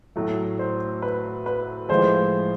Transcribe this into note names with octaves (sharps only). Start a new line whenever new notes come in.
A2 F#3 A3
C5
B4
B4
A2 F3 G#3 C5